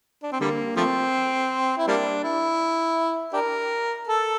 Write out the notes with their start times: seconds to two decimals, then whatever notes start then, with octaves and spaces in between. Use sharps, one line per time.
0.23 D4
0.32 C4
0.41 D3 G3 A#3
0.76 F3 A3 C4
1.78 E4
1.87 G3 A#3 D4
2.24 E4
3.33 D4 G4 A#4
4.07 A4